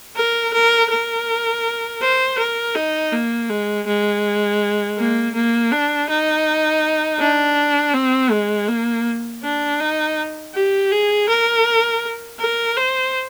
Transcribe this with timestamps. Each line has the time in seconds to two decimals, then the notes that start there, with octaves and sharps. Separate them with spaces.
0.16 A#4
0.53 A#4
0.90 A#4
2.01 C5
2.38 A#4
2.75 D#4
3.12 A#3
3.50 G#3
3.87 G#3
4.97 A#3
5.35 A#3
5.72 D4
6.10 D#4
7.20 D4
7.94 C4
8.31 G#3
8.68 A#3
9.43 D4
9.80 D#4
10.54 G4
10.91 G#4
11.29 A#4
12.39 A#4
12.76 C5